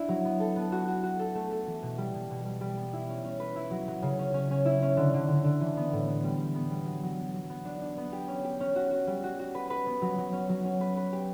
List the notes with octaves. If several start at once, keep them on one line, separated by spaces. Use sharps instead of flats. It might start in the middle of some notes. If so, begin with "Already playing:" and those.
Already playing: D4 E4
F#3
B3
A4
B3
F#4
F#4
F#4
A4
A3
A4
E3
B2
G3
B2
B2
G3
G3
B3
E4
C#4
C#4
B4
E4
F#3
F#3
C#3
C#4
C#4
C#4
E4
C#4
D3
D3
D3
D3
E3
B3
A2
B3
G3
G3
B3
G3
F#3
F#3
B3
F#3
B3
D4
D4
B3
G4
C#4
G4
C#4
F#4
F#4
G3
F#4
F#4
B4
B4
B3
F#3
F#3
C#4
F#3
C#4
B4
B4
G4